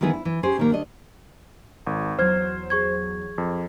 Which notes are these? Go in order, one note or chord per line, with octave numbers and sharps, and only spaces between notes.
D#3 E3 G#3 B3 G#4 B4
E4
E3
C#4 G4 G#4 C5
A#2 D#3 A#3
D2 D4 D#5
G#1
E2 F#3 C5 F6 G#6
G#4 C#6 G#6
F2